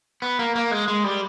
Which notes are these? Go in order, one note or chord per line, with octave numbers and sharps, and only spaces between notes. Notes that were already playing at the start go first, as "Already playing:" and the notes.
B3
A#3
A#3
G#3
G#3
G3